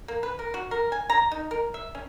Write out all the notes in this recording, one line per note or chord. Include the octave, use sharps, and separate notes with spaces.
A#3
B4
A#4
F#4
A#4
G#5
A#5
D#4
A#4
E5
C#4